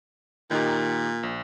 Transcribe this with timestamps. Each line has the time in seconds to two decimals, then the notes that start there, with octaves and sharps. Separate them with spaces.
0.51 A#2 D#3 D#4 G4
1.23 A#1